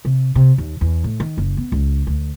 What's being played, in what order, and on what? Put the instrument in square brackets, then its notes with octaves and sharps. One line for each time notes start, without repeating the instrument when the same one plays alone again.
[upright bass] C3
C3
D#2
E2
A2
D#3
F#1
B3
C#2
D2